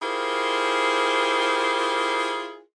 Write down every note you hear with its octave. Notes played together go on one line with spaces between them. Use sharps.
E4 F4 G4 G#4 A#4 C5